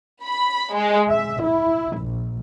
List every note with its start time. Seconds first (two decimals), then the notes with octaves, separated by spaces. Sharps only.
0.24 B5
0.74 G#3
1.10 E5
1.45 E4
2.00 A#1